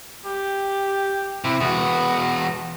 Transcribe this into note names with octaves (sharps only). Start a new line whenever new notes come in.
G4
C3 E4
E2 B3 F#4